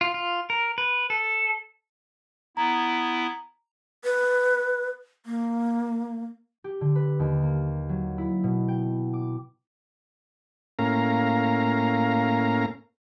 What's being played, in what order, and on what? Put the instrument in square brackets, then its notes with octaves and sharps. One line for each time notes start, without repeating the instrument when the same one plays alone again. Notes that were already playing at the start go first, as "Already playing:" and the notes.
[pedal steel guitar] F4
F4
A#4
B4
A4
[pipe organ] B3 E4 [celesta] A#5
[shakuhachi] B4
A#3
[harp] G4
D3
B4
D#2
A#3
F#3
E4
B2
G5
D6
[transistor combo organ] A2 A#3 C#4 F5 A#5